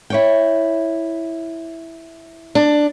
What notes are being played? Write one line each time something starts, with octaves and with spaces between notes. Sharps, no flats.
E4 C#5 G5
D4